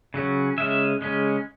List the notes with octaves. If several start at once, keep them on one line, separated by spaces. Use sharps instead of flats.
C#3 F#3 C#4
C#3 G#3 C#4 E5
C#3 G#3 C#4